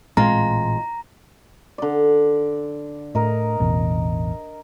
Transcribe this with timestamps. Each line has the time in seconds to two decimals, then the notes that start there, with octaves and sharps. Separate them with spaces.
0.17 A1 A#2 G#3 C4 F4 A#5
1.78 D3 D5
3.15 A2 A#4 D#5
3.60 A1 E2 B2